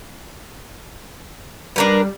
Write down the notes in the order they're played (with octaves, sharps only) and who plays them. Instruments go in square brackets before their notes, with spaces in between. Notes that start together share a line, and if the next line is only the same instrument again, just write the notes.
[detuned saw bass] G3 [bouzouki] D4 A#4 B4